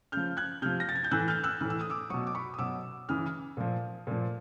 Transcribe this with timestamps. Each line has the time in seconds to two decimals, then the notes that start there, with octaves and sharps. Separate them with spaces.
0.12 C#3 F6 G6
0.17 F3
0.37 F#6 G#6
0.62 C3 F3 F6 G6
0.80 A#6
0.89 A6
0.96 G#6
1.04 G6
1.11 A2 E3 E6 F#6
1.28 F6 G6
1.44 E6 F#6
1.61 A2 E3 F6
1.70 E6
1.81 D#6
1.90 D6 E6
2.10 F#3 C#6 D#6
2.14 B2
2.27 D6
2.35 B5 C#6
2.54 D#6
2.58 B2 F#3 D6 E6
3.09 C#3 E3 D#6 F6
3.57 A#2 F3
4.07 A#2 F3